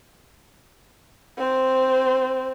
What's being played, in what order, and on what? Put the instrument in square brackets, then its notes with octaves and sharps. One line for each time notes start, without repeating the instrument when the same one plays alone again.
[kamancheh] C4 C5